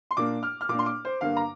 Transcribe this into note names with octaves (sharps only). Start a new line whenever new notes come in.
C6
A#2 A#3 D4 D6
F6
F6
A#2 A#3 D4 D6
C6
D6
C5
G2 D3 A#3 F5
A#5